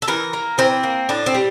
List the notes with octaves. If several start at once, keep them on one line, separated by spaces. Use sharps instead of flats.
A4
E3 A#4
A#3
E3 C4
A#3
A2 D4
C4
G3